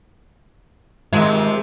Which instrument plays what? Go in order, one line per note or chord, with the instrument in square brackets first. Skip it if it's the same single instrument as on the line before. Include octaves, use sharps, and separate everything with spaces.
[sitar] C3 D#3 F3 [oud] G#3